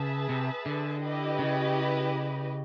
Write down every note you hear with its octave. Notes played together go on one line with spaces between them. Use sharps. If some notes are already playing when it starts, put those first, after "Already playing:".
Already playing: C#3 G#4 B4 E5 A5
C3
D3
E4 G4 B4 D#5
C#3